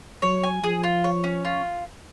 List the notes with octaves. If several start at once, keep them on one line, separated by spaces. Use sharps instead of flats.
F#3 C#5
G#5
F3 G#4
F4
C#5
C#4
F4